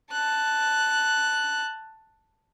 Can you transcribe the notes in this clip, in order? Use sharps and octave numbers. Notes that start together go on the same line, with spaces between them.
A5 F#6